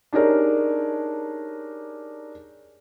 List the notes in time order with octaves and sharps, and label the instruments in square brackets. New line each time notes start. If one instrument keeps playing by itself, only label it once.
[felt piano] D4 D#4 G4 G#4 A#4 C#5